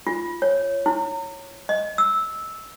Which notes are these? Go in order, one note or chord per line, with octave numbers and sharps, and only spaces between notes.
F4
C#5
E4
D#5
E6